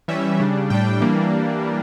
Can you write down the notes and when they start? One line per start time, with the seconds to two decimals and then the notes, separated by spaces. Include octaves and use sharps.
0.08 E3 G3 C#4 E5
0.40 C#3 G3 D4
0.70 A2 G3 D4 G5
1.00 E3 G3 A#3 D4